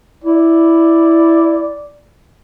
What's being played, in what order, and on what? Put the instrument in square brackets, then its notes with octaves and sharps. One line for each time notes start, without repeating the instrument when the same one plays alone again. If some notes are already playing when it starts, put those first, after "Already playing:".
[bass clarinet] E4 [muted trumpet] D5